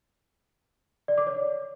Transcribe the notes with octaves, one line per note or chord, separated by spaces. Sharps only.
D5
D6
C#5